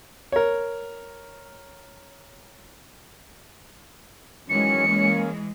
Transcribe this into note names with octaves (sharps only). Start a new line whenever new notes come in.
A#4 C#5
D#3 E3 F#3 G#3 C#4 C#7
A#3 C#4